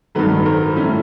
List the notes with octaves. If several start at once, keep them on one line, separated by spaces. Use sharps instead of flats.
G2 D#3 F#3 A4 B4
A#4 C5
A2 F3 A3 C#4